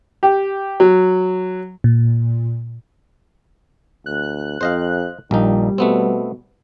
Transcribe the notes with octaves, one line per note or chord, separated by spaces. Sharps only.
G4
F#3
A#2
D2 F#6
F2 C5 D#5 F5
A#1 A#2 G3 D#4
B2 A3 B3 C4